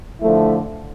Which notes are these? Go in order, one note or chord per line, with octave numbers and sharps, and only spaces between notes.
D3 F3 A3 E4